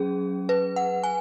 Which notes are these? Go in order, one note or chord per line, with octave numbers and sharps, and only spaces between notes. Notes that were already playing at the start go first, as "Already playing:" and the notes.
Already playing: F#3 C#4 G#4
B4
F#5
G#5